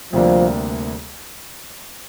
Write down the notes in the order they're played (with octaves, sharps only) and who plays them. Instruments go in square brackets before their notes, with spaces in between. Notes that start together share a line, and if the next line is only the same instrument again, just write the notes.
[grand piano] D2 C3 G3 A#3 D4 [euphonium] F3